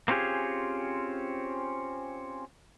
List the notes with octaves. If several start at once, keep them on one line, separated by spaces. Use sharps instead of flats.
A#3 C4 C#4 F4 G4 G#4